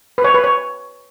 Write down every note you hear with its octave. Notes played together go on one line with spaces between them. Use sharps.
B4
C#5
B4
C#5